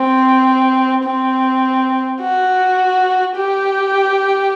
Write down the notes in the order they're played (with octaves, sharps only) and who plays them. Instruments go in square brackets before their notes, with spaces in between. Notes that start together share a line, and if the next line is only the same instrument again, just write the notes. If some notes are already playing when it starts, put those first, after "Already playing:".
Already playing: [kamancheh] C4
C4
F#4
G4